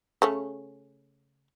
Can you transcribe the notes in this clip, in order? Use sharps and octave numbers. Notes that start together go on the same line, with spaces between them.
C#3 A3 C#4